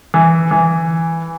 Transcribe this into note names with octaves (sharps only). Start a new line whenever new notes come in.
E3
E3